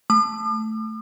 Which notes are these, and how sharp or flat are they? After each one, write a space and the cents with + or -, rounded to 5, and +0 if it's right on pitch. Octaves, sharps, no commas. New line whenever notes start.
A3 +0 D6 +45